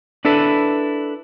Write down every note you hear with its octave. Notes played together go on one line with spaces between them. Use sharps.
D4 E4 A4 B4